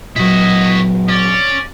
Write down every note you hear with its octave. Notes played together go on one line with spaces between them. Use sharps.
A#2 F#3 E4 F#4 D#5
C#4 D5